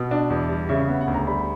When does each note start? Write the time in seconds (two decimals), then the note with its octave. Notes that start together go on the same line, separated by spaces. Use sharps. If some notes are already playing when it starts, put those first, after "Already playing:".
Already playing: B2
0.11 D4
0.30 E2
0.49 G3
0.69 C#3 E5
0.88 B3 E5
1.01 F#5
1.08 D2
1.14 A#5
1.27 G3 B5